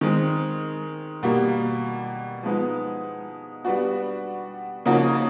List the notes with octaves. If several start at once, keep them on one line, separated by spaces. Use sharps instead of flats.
D#3 G#3 C4
B2 G3 A#3
F3 G#3 B3 D#4
G3 B3 D4 F#4
C#3 F3 A#3 D#4 F#4